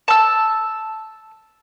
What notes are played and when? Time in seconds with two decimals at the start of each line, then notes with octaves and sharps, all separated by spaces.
0.08 A5 E6